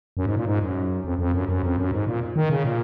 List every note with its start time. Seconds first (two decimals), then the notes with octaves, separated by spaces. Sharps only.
0.17 F#2
0.26 G#2
0.36 A#2
0.46 G#2
0.61 F#2
1.05 F2
1.19 F2
1.34 F#2
1.49 F#2
1.63 F2
1.78 F#2
1.92 G#2
2.07 A#2
2.36 D#3
2.50 C#3
2.64 A#2